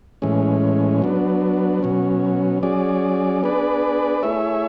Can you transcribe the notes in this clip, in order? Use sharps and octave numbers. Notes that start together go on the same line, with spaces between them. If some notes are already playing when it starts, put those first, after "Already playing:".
A2 E3 G#3 C#4
F#3 B3 D4
B2 F#3 C#4
F#3 C#4 G#4 D5
B3 D4 G#4 B4 D5
A3 E4 G#4 C#5 E5